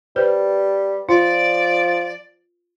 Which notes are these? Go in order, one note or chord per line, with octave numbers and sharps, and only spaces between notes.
G3 B4 C5
F3 F4 D5